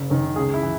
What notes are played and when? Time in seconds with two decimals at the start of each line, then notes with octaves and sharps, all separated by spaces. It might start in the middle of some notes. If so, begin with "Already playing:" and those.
Already playing: F#1
0.09 F#2 D#3
0.36 C#2 G#4
0.54 E4
0.63 E3